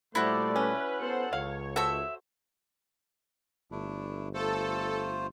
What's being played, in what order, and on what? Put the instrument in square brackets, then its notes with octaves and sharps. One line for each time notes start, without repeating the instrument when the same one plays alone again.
[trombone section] A#2 G3 A3 [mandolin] E4 F#4 [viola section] C5 D5
[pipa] C#4 [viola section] B4
[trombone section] B3 B4 [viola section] A4 C5 F#5
[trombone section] C#2 [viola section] C#5 [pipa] F5
[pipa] F#4 A4 C5 [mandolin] E5 E6
[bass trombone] G1 [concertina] A3 D4 E4
[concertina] A3 F4 C5 [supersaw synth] A4